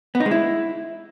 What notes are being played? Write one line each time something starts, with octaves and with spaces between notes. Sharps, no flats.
B3
D#4
G#3
E4